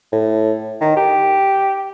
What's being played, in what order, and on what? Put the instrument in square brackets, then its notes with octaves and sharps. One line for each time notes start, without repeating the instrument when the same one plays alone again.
[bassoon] A2
D#3
G4